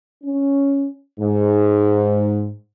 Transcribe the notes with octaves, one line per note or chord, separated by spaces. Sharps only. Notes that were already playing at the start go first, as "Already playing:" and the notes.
C#4
G#2